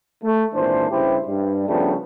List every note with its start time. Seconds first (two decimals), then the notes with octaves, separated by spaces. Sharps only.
0.24 A3
0.54 G#1 A#2 E3 D4 C5
0.91 G2 C#3 E4 G4 C5
1.27 G2 G3
1.68 C#3 F3 G3 A3 B3 D4